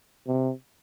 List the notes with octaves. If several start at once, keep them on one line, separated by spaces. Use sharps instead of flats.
C3